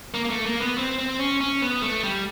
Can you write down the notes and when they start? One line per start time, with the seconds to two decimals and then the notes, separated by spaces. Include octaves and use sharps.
0.14 A#3
0.25 A#3
0.30 A3
0.46 A#3
0.61 B3
0.78 C4
0.98 C4
1.19 C#4
1.40 C#4
1.62 B3
1.82 A3
2.03 G3